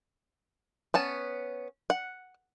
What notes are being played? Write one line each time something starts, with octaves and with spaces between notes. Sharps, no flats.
B3 C#4 A5
F#5